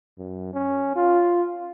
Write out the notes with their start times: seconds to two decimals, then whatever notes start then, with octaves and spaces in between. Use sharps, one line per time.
0.19 F#2
0.54 C#4
0.96 F4